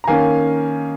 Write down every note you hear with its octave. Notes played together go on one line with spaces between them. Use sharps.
A#5
D#3 A#3 C#4 F5 G#5